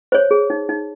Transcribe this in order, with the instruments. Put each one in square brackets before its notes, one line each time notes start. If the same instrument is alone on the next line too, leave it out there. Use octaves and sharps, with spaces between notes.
[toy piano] C5 C#5
G#4
D#4
D#4